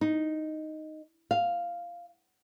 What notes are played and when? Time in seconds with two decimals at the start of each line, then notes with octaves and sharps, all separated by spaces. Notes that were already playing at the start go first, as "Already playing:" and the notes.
0.01 D#4
1.31 F5